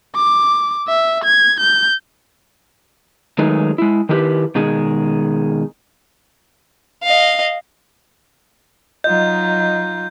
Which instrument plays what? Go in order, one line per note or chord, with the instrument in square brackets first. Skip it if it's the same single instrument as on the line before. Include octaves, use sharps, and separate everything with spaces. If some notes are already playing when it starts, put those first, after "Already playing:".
[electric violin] D6
E5
G#6
G6
[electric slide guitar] D#3 F#3 G#3 A3 D#4 B4
G#3 E4
D#3 E4 G4 B4
B2 D#3 G#3 G#4
[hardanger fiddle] D#5 F5
[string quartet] F#3 D#4 F4 [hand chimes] D#5 [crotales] G6